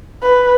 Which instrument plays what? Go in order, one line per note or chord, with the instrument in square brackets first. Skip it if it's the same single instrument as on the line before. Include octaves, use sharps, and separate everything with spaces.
[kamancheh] B4